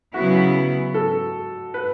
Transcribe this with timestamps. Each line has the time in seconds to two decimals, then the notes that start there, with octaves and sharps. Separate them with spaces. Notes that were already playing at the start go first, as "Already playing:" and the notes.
0.14 C#3 F#3 B3 E4 F#4
0.94 A4
1.74 B4